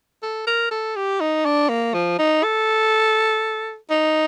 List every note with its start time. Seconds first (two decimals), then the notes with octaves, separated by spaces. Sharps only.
0.22 A4
0.47 A#4
0.71 A4
0.96 G4
1.20 D#4
1.45 D4
1.69 A#3
1.94 F3
2.19 D#4
2.43 A4
3.90 D#4